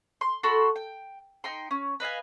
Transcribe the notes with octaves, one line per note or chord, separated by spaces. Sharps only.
C6
F#4 A4 B5 C6
G5
D#4 G5 C6
C#4
B4 D#5 F5 G#5